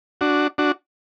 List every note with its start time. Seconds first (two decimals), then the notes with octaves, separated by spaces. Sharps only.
0.21 D4 F#4
0.58 D4 F#4